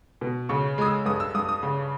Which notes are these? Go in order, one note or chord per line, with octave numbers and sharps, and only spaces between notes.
B2
C#3 C#6
G#3 D#6
E6
G2 D#6
E6
G2 D#6
D#6
C#3